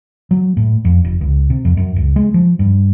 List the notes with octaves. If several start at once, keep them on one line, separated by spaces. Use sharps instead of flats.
F#3
A2
F2
F1
C#2
C3
F2
F#2
C#2
G#3
F3
G2